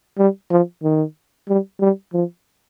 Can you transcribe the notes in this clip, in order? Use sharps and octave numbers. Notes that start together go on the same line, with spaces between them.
G3
F3
D#3
G3
G3
F3